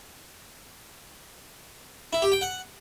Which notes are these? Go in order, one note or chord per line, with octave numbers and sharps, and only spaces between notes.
E4
G4
G5
F#5